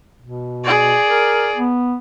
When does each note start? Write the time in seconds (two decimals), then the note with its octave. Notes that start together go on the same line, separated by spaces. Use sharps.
0.22 B2
0.64 G#4 D5
1.06 A#4
1.56 B3